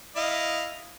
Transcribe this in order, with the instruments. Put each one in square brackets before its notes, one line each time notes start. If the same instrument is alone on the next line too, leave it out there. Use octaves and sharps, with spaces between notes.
[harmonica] E4 D#5 F5